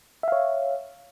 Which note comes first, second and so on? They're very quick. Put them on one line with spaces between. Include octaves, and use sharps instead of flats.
E5 F5 C#5